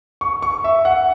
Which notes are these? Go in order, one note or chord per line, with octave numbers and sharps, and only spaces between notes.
C#6
C#6
E5
F#5